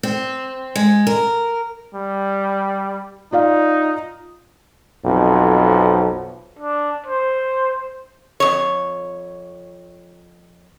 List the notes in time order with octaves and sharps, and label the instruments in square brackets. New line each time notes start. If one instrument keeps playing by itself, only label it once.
[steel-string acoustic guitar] C4
G#3
A#4
[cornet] G3
[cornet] D#4 [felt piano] F4 D5 F5
[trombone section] B1 F2
[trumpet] D4
C5
[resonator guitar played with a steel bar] F2 C#5